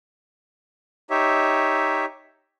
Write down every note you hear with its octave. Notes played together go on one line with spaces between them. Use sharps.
D#4 G4 C#5 E5